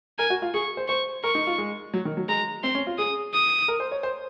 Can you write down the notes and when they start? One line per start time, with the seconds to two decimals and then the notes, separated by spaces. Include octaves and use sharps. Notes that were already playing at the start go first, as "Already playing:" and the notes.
0.18 A#4 G#5
0.30 F#4
0.42 F4
0.54 G#4 C#6
0.77 C5
0.88 C5 C#6
1.24 A#4 C#6
1.35 D#4
1.47 F4
1.58 G#3
1.94 F#3
2.05 D#3
2.17 F#3
2.28 G#3 A#5
2.63 C4 C6
2.75 C#4
2.87 F4
2.98 G#4 D#6
3.33 D#6
3.68 A#4
3.80 C5
3.91 C#5
4.03 C5